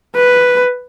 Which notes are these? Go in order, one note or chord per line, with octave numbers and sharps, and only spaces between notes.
B4